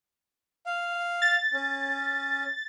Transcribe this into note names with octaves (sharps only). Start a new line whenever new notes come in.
F5
A6
C#4